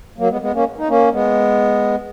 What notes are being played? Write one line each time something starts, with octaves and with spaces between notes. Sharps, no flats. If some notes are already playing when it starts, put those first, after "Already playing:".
F#3 A#3
G#3 B3
G#3 B3
A#3 C#4
D#4
A#3 C#4
G#3 B3